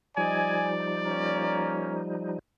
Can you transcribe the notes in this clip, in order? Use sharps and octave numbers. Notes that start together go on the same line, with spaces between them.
F3 G3 D#4 D5 D#5 G#5
A#3 C#4 A#5